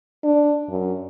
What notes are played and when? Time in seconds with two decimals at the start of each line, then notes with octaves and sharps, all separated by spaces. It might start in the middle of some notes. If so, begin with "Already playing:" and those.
0.24 D4
0.69 F#2